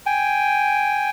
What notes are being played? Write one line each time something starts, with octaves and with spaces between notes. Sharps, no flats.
G5 G#5